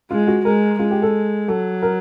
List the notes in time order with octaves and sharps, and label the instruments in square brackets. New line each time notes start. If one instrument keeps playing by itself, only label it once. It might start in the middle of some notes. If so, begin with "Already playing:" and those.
[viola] G#3 [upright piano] F4
[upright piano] F#4
[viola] G#3 [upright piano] A#4
[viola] G#3 [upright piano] F4
[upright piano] G4
A4
[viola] F#3 [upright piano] A4
[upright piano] A#4